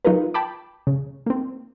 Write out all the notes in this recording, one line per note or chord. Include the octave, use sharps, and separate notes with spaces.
F#3 D#4 F4 G#4 A#4 B4
G5 A5 B5 D6
C#3
A#3 C4